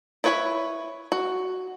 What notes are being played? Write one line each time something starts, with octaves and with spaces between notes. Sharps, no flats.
E4 B4 C#5 G5 B5
F#4